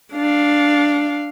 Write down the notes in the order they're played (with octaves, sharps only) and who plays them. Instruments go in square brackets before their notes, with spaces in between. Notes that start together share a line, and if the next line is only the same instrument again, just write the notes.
[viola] D4 F5